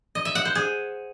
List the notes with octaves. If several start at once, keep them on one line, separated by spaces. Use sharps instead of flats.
D#5
E5
F#5
C5
G#4